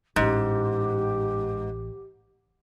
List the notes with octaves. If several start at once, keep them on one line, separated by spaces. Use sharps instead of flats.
A1 G#2 G4